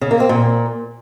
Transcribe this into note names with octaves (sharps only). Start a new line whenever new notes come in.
C#3
A#3
C4
A#2